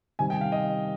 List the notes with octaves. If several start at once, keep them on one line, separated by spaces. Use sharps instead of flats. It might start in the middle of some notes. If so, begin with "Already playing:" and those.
C3 D#3 G3 G#5
G5
F5
D#5